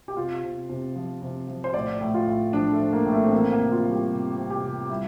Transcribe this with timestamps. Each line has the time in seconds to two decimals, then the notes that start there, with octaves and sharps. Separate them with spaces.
0.08 G4
0.16 C3 F4
0.43 C3
0.69 C3
0.96 F3
1.22 C3
1.48 F3
1.64 C5
1.74 A2 D5
2.01 A2
2.14 F4
2.27 A2
2.53 F3 D4
2.73 A3
2.80 F3
2.93 A#3
3.05 A2
3.12 A3
3.23 C4
3.32 E3 A#3
3.43 C4
3.52 A#3
3.58 C3
3.72 F4
3.84 G3
3.91 G4
4.11 C3
4.37 C3
4.50 G4
4.64 C3
4.90 G3 E4